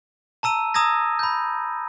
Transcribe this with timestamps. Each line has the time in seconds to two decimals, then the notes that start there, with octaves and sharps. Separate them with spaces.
0.43 A5 A#5 E6 D#7
0.74 A#5 D#6 E6 G#6 A#6
1.19 B5 G6